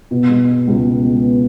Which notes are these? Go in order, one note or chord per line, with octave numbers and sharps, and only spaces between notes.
B2
G#3
B3
C#2
B2
G#3
B3